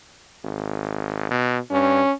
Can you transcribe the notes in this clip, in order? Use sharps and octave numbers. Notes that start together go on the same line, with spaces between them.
G#1
B2
G2 C#4